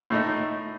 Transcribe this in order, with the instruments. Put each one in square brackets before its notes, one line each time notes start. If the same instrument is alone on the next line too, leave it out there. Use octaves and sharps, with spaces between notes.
[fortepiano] A2 A3 D#4